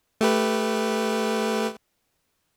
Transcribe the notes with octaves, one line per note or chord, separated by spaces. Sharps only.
A3 G4 B4